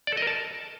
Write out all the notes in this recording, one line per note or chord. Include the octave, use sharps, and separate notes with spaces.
D5
A4
D#5
A#4
A5